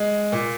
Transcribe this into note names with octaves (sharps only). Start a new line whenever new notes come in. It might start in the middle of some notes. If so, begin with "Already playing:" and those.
Already playing: G#3
A#2